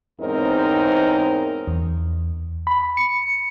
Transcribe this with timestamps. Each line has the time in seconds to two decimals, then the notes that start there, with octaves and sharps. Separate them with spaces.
0.21 E2 G#2 C4 C#4 D#4 A#4
1.67 E2
2.67 B5
2.97 C#7